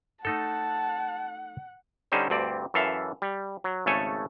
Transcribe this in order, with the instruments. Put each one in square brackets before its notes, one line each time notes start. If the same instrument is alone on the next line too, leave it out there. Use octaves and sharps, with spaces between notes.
[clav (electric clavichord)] A3 D#4 A4 [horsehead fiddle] F#5 [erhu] A5
[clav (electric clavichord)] D3 G3 C#4 D#4 C5
D2 G2 C4 D5
F#2 E3 A4 E5 F5
G3
F#3
G#1 C#3 A3 A4 C#5 G#5